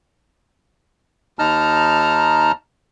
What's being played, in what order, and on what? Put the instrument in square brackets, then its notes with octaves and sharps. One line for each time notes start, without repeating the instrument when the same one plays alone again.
[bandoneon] D#2 D#4 A5 A#5 F6